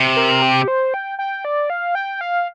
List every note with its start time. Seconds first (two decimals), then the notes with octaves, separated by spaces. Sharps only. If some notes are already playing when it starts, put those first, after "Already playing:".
Already playing: C3
0.17 A#4
0.42 G4
0.68 C5
0.94 G5
1.19 G5
1.45 D5
1.70 F5
1.95 G5
2.21 F5